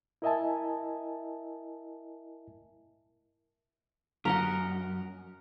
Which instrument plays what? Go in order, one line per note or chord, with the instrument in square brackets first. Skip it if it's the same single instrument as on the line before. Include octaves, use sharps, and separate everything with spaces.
[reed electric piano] E4 A#4 D#5 E5 G#5 A5
[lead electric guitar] F#2 [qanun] A#4 D#5 F#5